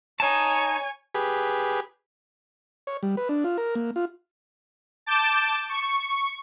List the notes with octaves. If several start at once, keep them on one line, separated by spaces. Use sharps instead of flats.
D#4 C#5 G#5 A5
G4 G#4 B4
C#5
G3
B4
D4
F4
A#4
A#3
F4
A5 D6 G6 E7
C#6